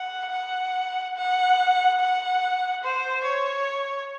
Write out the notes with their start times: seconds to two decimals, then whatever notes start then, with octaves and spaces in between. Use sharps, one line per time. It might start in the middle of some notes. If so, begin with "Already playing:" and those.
Already playing: F#5
0.32 F#5
1.17 F#5
1.99 F#5
2.83 C5
3.24 C#5